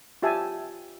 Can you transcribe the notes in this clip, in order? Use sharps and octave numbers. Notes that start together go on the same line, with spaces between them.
F4 G4 E5 G#5 A5